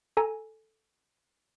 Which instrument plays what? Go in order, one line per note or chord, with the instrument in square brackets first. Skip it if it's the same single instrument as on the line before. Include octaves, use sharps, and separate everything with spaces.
[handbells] A4 G#5 A#5